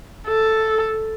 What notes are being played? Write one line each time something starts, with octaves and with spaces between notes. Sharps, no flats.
A4